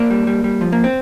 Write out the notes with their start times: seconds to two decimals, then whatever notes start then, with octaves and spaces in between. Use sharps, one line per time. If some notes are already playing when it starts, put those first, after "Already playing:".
Already playing: A#3 D4
0.10 G3
0.27 G3
0.44 G3
0.61 F3
0.72 A#3
0.84 C4